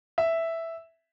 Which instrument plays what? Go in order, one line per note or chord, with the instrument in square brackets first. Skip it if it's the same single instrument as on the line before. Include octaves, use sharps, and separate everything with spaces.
[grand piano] E5